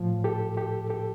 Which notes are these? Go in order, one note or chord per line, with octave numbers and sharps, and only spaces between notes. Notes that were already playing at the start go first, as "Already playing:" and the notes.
Already playing: A2 F3
G4 A4
G4 A4
G4 A4